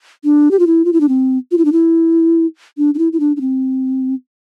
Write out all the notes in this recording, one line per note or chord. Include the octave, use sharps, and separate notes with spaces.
D4
G4
F4
E4
F4
E4
D4
C4
F4
E4
D4
E4
D4
D4
E4
E4
D4
D4
C4